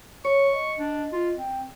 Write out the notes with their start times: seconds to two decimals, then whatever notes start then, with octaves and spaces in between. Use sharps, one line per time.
0.25 C#5 C#6
0.53 D#5
0.79 D4
1.13 F4
1.37 C4